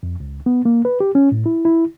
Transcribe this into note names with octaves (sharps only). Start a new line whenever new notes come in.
F2
C#2
B3
A#3
B4
G4
C#4
A2
E4
E4